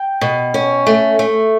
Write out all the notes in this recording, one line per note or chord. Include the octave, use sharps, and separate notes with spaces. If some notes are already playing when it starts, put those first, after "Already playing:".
Already playing: G5
B2
C#4
A3
A3